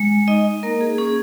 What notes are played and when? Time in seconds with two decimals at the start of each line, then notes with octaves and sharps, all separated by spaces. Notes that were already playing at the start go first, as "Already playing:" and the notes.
Already playing: G#3
0.28 D#4 D#5
0.63 A#3 A#4
0.81 G#4
0.98 C#4 G#4